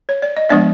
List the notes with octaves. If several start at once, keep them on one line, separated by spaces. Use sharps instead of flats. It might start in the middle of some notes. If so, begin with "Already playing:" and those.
C#5
D5
D#5
F3 G#3 B3 D4 D5 E5